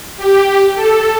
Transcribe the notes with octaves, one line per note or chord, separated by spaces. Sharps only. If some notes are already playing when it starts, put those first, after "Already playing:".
G4
A4